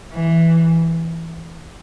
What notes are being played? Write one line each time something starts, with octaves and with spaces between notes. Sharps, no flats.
E3